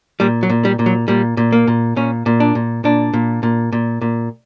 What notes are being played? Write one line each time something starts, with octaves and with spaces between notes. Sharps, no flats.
A#2 G3
F#3
A#2
G3
A#2
F#3
A#2 G3
A#2
A#3
A#2
A#2 C#4
A#2
D4
A#2
A#2 D4
A#2
A#2
A#2
A#2